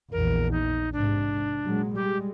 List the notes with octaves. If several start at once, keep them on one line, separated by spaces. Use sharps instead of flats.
A#1 E2 A#4
D#4
G#2 C3 D4
A#2 F#3 G#3
G3 G#3 G4